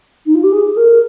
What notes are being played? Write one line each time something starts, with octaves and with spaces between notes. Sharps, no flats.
D#4
F4
G4
G#4
G#4
A#4